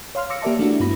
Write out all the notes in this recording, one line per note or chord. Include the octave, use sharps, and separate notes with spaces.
C#5 F5 C6 F6
C6 D6 E6 A#6 C#7
A#3 G4 A#4 D5 E5 A5
A3 D4 E4 F#4
G2 B3 E4 B5 A#6